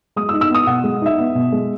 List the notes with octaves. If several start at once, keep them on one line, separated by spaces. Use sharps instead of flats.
G#3 D#6
E6
D#4
E6
B3 D#6
B2 F#5
G#3
D#4 E5
B3
B2
G#3